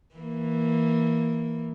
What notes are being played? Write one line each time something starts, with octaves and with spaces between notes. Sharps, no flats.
E3 A#3